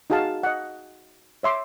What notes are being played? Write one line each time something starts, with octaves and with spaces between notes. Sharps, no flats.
D#4 F#4 G#4 F5 A5
D#5 F#5
C#5 E5 C6 D6